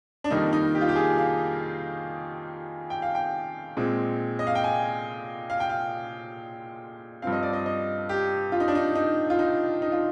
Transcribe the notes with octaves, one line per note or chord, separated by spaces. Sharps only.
D4
F2 D#3 G3 A#3 D#4
D#4
G4
F4
G4
G#4
F5
G5
F5
G5
A#2 G#3 C4
D#5
F5
G5
G#5
F5
G5
F5
G2 F3 C4 F5
D#5
D5
D#5
D#5
G4
F4
D#4
D4
D#4
D#4
F4
D#4
D#4
F4